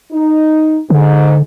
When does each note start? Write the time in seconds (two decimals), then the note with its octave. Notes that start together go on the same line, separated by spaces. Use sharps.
0.12 D#4
0.90 G#2 D3